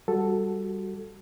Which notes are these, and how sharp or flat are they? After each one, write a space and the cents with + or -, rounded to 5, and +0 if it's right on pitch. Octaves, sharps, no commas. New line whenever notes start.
G3 +0 F#4 +0 A4 +0